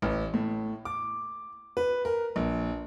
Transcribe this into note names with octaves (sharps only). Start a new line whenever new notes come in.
A1
A2
D6
B4
A#4
A#1